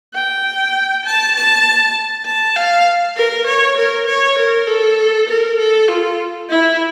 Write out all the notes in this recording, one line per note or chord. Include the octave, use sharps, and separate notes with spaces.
G5
A5
A5
A5
F5
A#4
C#5
A#4
C#5
A#4
A4
A#4
A4
F4
E4